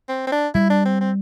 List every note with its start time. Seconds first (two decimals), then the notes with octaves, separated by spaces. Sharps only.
0.09 C4
0.27 C4
0.32 D4
0.55 G3 E4
0.70 D4
0.85 C4
1.01 C4